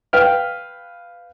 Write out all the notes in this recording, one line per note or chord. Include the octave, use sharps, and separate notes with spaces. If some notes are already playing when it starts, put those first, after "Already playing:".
B4 F5 G5 F6